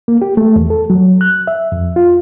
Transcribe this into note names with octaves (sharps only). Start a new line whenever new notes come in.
A#3
G4
A3
E2
A4
F#3
F#6
E5
F2
F4